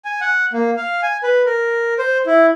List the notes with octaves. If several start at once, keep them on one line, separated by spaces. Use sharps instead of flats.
G#5
F#5
A#3
F5
G#5
B4
A#4
C5
E4